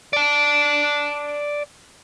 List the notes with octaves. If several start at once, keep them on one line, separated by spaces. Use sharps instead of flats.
D5 A5